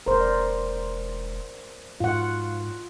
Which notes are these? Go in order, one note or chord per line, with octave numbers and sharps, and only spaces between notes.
E1 A#4 C5
D5
G#2 F4 F#5